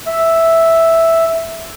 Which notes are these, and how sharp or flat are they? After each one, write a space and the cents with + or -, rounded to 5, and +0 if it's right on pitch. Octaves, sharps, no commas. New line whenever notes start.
E5 +0